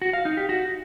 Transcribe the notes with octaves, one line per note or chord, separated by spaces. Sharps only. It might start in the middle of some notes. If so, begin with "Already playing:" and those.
F#4
F5
D#4
G4
F#4